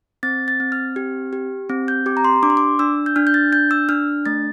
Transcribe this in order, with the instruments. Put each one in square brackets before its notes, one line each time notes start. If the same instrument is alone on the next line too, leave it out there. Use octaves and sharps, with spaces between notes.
[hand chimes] C4 A6
A6
C4
F6
G4
G4
C4
G6
G4 D6
A#5
C6
D4 D6
C6
D6
D4 E6
G6
D4 F6
G6
A6
D4 G6
E6
D4 F6
A3 A6